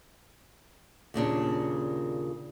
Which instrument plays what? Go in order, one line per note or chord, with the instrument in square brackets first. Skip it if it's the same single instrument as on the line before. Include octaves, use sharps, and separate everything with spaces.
[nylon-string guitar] D#2 A#2 C#3 D4